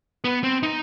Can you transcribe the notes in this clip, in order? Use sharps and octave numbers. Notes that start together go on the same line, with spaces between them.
B3
C4
D#4